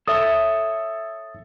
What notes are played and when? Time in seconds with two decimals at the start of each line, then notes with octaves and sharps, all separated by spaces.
0.08 A4 C#5 E5 D#6